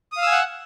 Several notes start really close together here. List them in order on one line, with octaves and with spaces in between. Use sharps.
D#6 F5 E6 G#5 F#5